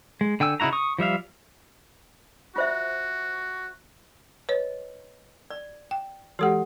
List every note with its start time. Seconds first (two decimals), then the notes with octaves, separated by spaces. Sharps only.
0.21 G#3
0.40 D3 G5 G#5 E6
0.60 C#3 D#4 E4 F#4 A#5
0.73 C#6 D#6
0.99 F3 G3 E5 F5
2.56 F4 F#4 C5 E5
4.49 B4 C#5 D#5
5.50 D5
5.91 G5
6.39 E3 G#3 F#4 G4 A4 F#5